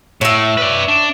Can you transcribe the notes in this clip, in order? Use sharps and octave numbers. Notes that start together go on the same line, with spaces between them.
A2 C#5 E5
B4 D5
D4